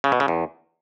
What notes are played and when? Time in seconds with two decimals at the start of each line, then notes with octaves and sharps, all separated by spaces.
0.04 C#3
0.12 B2
0.20 C#3
0.28 E2